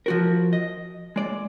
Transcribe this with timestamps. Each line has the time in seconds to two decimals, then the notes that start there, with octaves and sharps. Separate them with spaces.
0.06 F3 F#4 A#4
0.53 D#5
1.16 G#3 D5